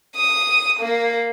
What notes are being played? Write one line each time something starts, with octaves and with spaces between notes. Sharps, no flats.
D#6
A#3